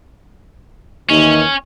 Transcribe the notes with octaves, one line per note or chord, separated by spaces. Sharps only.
D#2 E3 C#4 D#4